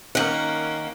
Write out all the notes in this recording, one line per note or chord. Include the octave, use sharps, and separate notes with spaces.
D#3 A#3 C#4 F#5